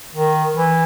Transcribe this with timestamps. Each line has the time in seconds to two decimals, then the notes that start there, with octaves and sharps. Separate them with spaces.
0.15 D#3
0.56 E3